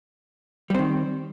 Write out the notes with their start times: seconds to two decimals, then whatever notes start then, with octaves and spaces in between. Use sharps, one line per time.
0.70 G3
0.75 C4
0.79 D#3